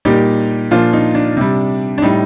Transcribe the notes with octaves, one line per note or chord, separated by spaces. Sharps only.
A#2 G3 D#4 G4
A#2 F3 D4 F4
D#4
D4
C3 G3
D4
A2 G3 D#4